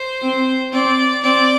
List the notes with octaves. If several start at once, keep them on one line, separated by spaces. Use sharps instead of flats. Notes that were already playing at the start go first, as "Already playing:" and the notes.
Already playing: C5
C4
C4 D5
C4 D5